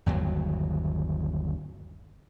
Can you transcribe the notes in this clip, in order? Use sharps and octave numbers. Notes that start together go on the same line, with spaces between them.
G1 D#2 F#3